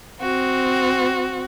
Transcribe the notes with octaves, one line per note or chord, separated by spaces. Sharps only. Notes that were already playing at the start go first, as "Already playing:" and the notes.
C4 F#4